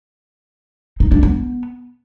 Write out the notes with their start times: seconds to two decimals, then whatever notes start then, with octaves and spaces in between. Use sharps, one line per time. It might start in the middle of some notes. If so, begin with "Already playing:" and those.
1.00 D#4
1.12 D4
1.23 B3